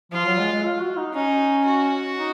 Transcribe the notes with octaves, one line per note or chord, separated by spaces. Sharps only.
F3 F4
F#3
G#3
G#3
F4
F#4
D#4
C#4 D#4
F#4
D#4